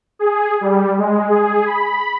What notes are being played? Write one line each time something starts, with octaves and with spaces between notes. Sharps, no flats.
G#4
G3
G#3
G#4
B5